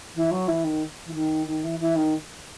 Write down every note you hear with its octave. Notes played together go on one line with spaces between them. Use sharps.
E3
F#3
E3
D#3
E3
D#3
D#3
E3
E3
D#3